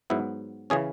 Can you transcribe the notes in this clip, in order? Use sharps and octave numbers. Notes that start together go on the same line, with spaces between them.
G#2 F#3 B3 E4
C#3 E3 C#4 G#4